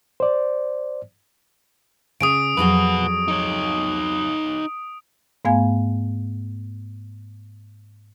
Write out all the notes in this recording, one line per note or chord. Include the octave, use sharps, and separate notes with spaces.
C5 D5
C#3 G#5 D#6 D7
F2 F#3 F#4 G#4 B4
D#4 C#5
G#2 A3 B3 F5 G#5 G#6